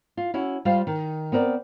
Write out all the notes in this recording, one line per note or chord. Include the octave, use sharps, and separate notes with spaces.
F4
C#4 E4 F#4
G3 F4 C5 F5
D#3
B3 C4 A#4 D5